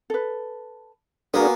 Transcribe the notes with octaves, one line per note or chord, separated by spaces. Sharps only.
A4 B4
A#3 B3 D4 F#4 G#4 A#4 G#5